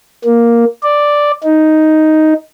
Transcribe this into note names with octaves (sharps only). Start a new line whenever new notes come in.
A#3
D5
D#4